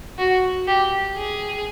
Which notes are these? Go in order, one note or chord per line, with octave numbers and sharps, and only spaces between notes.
F#4
G4
G#4